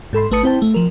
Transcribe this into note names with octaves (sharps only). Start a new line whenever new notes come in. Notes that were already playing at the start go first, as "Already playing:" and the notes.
G#2 A4 B5 C6
G#1 A3 B4 A5 D#6 C#7
C4 E4 C5 G5 A5
A3
F3 A#4